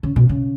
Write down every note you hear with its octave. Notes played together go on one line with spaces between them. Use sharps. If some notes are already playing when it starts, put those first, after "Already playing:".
C#3
B2
C#3